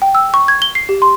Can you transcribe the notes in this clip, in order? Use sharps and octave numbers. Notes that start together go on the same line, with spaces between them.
G5
E6
C#6
G#6
G7
C7
G4
C6